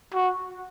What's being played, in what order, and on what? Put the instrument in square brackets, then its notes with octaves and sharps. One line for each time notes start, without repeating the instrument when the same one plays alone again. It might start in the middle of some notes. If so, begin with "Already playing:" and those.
[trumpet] F#4